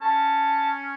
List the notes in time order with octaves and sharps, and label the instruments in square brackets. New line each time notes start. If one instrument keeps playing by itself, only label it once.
[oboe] C#4 [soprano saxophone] A5